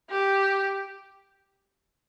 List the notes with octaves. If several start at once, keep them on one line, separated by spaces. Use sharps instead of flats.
G4